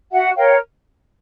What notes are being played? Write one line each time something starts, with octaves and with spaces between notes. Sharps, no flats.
F#4 E5 F#5
A#4 C#5 F5 G5